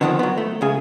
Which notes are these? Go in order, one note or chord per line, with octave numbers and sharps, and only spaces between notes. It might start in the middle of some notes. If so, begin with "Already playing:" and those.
D3 D#3 F3 B3 C4
F#3 B3
A3
C#2 C#3 G#4